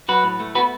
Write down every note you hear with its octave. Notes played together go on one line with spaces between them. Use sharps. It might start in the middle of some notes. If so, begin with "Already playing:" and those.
F#3 F#4 B4
A2
A3
B3 F#4 B4